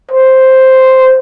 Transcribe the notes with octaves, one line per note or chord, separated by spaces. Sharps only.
C5